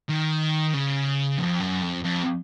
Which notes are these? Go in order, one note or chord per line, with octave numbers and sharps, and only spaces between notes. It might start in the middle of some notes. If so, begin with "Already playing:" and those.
D#3
C#3
F2
F#2
F2
F2